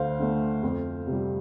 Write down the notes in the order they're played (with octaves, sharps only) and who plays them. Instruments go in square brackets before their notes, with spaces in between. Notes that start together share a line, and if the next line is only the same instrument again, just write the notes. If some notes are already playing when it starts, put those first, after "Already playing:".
Already playing: [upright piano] D2 C5 F5
D3 A3
F2
C3
G3